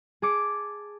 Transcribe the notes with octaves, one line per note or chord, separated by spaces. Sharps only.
G#4 A5 D6 C#7